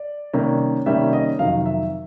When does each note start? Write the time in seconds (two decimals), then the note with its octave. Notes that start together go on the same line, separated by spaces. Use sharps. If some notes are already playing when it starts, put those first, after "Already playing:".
Already playing: D5
0.34 C3 D#3 G3 A#3 C#4
0.86 C3 D#3 G3 A#3 C#4 E5
1.13 D#5
1.39 F2 C3 D#3 F#3 F5
1.66 E5